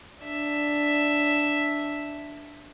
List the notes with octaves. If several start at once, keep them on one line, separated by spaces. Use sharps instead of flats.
D4 E5